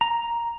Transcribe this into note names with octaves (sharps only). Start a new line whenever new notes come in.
A#5